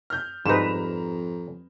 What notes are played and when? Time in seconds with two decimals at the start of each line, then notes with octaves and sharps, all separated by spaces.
0.10 F6 G6
0.46 F2 G#2 G3 D#4 B4 A#5 E7